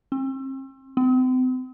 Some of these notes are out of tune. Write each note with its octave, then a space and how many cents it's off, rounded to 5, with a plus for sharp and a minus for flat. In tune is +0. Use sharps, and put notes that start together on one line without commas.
C4 +40
C4 -40